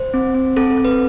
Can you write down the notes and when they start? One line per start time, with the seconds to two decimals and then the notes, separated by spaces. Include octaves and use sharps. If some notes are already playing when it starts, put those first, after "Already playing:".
Already playing: C5
0.14 C4
0.34 C4
0.57 C4 A4
0.71 A4
0.77 C4
0.85 B4